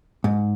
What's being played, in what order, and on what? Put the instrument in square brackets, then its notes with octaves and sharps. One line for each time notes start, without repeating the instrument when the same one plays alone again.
[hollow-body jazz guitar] G#2